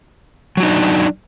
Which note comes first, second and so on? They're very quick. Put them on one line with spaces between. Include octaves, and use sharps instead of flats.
F#3 F#4 D#4 D4